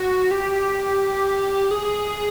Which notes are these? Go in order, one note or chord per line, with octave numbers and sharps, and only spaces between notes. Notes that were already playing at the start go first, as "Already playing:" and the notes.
Already playing: F#4
G4
G#4